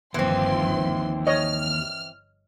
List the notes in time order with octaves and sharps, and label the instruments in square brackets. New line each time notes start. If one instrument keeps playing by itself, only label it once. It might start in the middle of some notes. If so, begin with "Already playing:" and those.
[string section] G1 F3 C6 [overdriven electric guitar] D#2 [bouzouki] E3 C4
[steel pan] C#5 D#5 [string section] F6